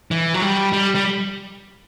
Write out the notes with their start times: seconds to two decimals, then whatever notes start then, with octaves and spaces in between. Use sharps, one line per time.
0.11 E3
0.34 F#3
0.42 G3
0.73 G3
0.95 G3